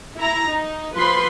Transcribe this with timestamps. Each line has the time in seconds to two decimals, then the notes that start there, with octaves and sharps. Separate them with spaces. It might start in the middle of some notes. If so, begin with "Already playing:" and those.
0.17 E4 A#5
0.49 D#4
0.96 F3 B4 B5 C6